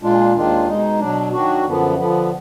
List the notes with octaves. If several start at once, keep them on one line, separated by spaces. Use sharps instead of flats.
A#2 G#3 D4 F4
D#2 D#3 G#3 D4 F4
B2 G#3 D#4
B2 F#3 D4
D#3 F#3 D4 F#4
F#2 D3 F3 B3
D3 F3 B3